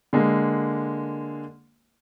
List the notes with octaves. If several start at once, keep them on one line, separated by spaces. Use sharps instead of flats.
D3 G#3 A#3